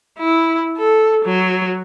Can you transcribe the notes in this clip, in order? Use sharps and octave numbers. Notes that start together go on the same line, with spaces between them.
E4
A4
F#3